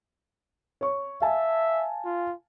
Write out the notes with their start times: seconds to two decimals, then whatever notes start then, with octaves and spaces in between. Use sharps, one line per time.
0.81 C#5 C#6
1.22 E5 F5 G#5 A5
2.05 F4